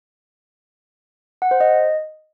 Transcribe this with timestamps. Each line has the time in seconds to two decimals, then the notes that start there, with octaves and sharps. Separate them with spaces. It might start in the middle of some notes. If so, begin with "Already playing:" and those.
1.42 F#5
1.51 C5
1.60 D#5